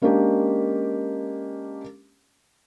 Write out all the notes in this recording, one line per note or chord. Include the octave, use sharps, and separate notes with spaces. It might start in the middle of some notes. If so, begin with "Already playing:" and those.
G#3 A#3 C#4 D4 G4